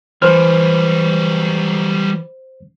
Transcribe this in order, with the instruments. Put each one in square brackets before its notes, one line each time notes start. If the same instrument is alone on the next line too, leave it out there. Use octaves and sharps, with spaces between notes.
[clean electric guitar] E3 [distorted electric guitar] F#3 G3 [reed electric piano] C5 F6